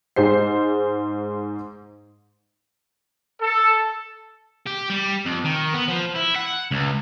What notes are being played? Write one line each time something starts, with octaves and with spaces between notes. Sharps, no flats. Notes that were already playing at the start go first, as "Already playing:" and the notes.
G#2 G#3 C5 C7
A4
G4
G3
F2
D#3
B3
F3
E4
F#5
C#2